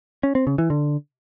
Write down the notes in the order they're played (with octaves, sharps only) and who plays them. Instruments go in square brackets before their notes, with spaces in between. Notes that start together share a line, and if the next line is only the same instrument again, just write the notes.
[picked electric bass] C#4
C4
C#3
E3
D3